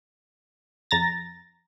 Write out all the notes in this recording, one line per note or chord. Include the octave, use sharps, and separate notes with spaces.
F2 A#5 A6 A#6